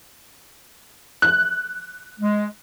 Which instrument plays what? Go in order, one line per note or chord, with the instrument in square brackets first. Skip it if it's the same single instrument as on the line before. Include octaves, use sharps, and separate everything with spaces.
[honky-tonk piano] F#6
[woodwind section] G#3